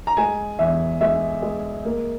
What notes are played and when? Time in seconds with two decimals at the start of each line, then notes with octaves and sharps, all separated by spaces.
0.07 A#5
0.17 G#3 G#5
0.59 E2 E5
1.01 G#3 E5
1.42 G#3
1.85 A#3